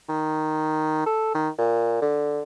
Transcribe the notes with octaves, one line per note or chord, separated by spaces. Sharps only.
D#3
A4
D#3
A#2
D3